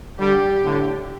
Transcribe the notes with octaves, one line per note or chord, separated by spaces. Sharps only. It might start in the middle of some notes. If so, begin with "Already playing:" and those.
D3 G3 G4
A2 D3